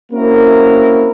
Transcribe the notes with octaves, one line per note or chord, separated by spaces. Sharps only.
A#3 C4 C#4 E4 F#4 A#4